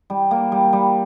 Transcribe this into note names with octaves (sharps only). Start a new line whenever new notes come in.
G3
A#3
G3
G3